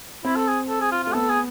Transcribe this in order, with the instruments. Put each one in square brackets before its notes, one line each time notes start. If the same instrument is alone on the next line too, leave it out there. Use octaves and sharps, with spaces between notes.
[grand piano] C4 [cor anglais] E4
[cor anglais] A4
G#4
A4
G#4
F4
[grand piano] A3 [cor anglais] F4
[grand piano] B3 [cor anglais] A4
[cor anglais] G#4